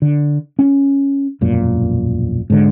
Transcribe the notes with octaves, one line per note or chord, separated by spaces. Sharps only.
D3
C#4
E1 A#1 F#2 A#2
G#2 D3